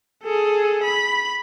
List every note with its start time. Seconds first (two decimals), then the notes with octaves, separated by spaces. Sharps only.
0.23 G#4 A4
0.83 B5